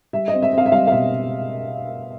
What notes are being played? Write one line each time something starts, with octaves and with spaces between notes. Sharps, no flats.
G3 E5
D#5
C4
E5
C4 F5
E5
G3 F5
F5
B2 E5